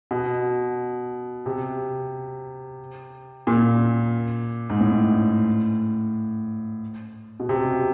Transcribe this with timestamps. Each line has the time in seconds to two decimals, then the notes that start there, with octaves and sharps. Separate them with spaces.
0.11 B2
1.46 C3
3.47 A#2
4.70 G#2
4.81 A2
7.40 B2
7.49 C3